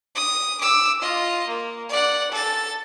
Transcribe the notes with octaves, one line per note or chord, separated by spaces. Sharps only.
D#6
D6 E6
F4 D#5
A#3
D5 F#5
A4 A6